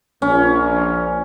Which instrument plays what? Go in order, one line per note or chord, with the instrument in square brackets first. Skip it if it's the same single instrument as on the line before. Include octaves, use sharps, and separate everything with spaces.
[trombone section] A#1 [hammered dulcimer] C#4